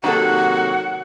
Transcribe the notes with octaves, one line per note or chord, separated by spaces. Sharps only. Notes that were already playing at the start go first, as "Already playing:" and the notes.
C3 D#3 F#3 A#3 F#4 A4 F#5